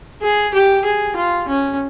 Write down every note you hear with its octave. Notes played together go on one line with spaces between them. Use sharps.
G#4
G4
G#4
F4
C#4